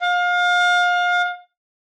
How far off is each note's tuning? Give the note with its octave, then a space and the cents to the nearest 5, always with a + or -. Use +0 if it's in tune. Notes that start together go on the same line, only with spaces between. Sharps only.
F5 +30